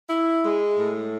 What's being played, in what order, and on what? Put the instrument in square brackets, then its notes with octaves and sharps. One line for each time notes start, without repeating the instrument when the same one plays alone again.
[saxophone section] E4
G#3
A2